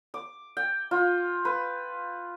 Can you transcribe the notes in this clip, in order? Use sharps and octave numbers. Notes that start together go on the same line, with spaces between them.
D6
G5
F4
B4